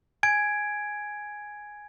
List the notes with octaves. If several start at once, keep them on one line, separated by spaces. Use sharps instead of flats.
G#5 G#6 D7